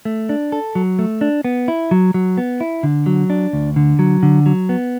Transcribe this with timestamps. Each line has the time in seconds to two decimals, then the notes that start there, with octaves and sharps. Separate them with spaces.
0.05 A3
0.29 D4
0.52 A4
0.75 F#3
0.99 A3
1.21 D4
1.45 B3
1.68 E4
1.91 F#3
2.14 F#3
2.38 B3
2.61 E4
2.83 D3
3.06 F#3
3.30 D4
3.53 D2
3.76 D3
3.99 F#3
4.23 D3
4.46 F#3
4.69 B3